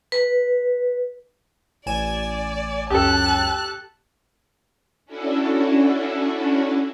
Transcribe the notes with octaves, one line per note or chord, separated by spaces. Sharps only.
B4
A1 D5 G#5 E7
C#2 F#2 G4 A4 A5 F#6
C#4 D4 E4 F#4 A4